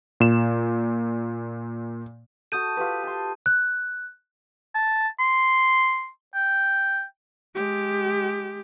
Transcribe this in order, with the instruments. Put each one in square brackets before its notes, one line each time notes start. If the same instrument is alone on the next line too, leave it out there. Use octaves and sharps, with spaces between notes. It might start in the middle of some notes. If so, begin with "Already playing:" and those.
[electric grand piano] A#2 E7
[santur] F#4 A4 [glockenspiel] D#6 G6 D#7
[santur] F4 G4 B4
A5 C6
[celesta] F#6
[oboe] A5
C6
G5
[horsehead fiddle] G#3 G4